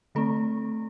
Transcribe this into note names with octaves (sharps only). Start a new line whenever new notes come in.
D3 A3 C4 A4